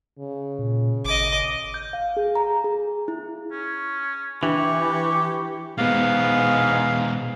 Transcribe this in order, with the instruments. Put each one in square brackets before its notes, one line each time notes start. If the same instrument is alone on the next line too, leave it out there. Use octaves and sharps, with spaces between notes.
[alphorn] C#3
[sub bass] A#2
[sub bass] G#1 [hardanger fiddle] D#5 D6
[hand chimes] G6
F5
G#4
A#5
G#4
E4
[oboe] C#4
[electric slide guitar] E3 [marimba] D4 [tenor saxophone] G4 [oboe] C#6
[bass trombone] G#2 [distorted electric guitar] B2 G#3 [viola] B3 [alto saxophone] F5